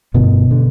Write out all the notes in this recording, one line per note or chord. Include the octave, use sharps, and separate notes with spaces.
G1 G2 B2 D3 B3
D3